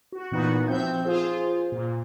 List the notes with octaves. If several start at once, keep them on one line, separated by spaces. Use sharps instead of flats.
F#4
A#2 E3 B3 D#4 F#4
F3 C4 E5 G6
F4 G#4 C5
A#2